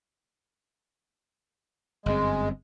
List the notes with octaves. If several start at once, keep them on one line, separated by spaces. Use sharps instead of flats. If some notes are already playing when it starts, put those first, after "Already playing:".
G1 F#2 G#3 C4